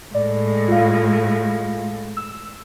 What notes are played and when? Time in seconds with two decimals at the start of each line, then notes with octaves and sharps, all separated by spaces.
0.14 A2 G#3 D5
0.68 F4 F5
2.17 E6